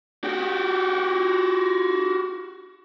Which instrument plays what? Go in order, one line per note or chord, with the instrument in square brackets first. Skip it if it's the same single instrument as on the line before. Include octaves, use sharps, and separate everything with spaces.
[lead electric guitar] F#4 G4